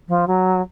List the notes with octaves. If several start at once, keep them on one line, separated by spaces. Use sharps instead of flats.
F3
F#3